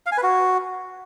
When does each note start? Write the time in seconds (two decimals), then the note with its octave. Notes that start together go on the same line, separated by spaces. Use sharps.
0.06 F5
0.12 G#5
0.17 B4
0.23 F#4